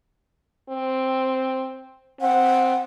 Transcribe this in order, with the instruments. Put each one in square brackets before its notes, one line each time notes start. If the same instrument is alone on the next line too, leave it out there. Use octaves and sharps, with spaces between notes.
[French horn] C4
[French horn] C4 [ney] F#5